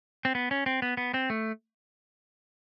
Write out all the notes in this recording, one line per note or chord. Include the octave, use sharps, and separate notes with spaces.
C4
B3
C#4
C4
B3
B3
C4
A3